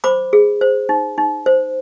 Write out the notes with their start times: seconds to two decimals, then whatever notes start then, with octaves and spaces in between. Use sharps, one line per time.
0.04 C5 B5 D6
0.33 G#4
0.61 C5
0.89 D#4
1.18 D#4
1.46 C5